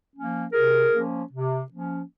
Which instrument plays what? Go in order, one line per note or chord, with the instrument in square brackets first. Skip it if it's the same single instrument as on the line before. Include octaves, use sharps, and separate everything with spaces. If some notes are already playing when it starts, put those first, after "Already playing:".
[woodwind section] F3 A#3 C#4
C3 G#4 A#4
F3 A#3 C#4
C3
F3 A#3 C#4